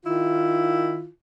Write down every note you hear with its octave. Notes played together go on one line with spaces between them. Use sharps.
D#3 E4 F4